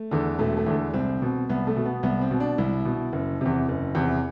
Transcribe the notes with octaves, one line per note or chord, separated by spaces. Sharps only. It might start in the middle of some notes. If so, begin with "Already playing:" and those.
Already playing: A3
E2 D3
E1 A3
A3
E2 D3
C2 C4
B2
C2 B3
A3
B2
B3
C2 B3
C4
B2
D4
C2 E4
B2
F#1
E2 C3
F#1
E2 C3